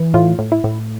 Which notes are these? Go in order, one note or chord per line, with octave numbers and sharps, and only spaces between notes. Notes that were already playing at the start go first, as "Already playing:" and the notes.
Already playing: E3
A2 F4
A2
E4
A2